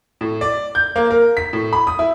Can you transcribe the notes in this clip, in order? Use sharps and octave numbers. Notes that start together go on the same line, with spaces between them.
A2
D5
G6
A#3
A#4
B6
A2
B5
D#6
E4